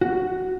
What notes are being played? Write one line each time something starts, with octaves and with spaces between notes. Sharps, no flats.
F#4